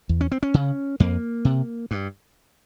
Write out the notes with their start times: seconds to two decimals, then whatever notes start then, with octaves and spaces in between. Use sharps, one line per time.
0.09 E2
0.21 C#4
0.32 C4
0.43 C#4
0.54 C#3
1.00 F2 A#3
1.45 C3
1.91 G2